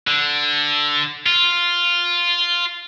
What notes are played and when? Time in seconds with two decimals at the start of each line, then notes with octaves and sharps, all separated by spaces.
0.07 D3
1.26 F4